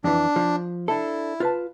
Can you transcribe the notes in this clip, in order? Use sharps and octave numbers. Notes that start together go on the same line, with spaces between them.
F2 E3 D4
F3
D4 E4 A4
F4 B4 A5